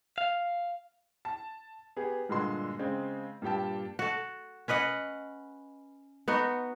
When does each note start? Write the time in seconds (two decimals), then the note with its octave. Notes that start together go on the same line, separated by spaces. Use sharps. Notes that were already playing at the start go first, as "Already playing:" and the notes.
0.18 F5
1.25 A5
1.97 B3 G4 G#4
2.29 G2 A#2 D3 G#3 F#4 C6
2.79 C#3 G#3 C4
3.42 G2 A#2 G4 G5 A5
3.99 F#4 A4
4.68 C#4 B4 D#5 F#5
6.28 B3 D#4 F#4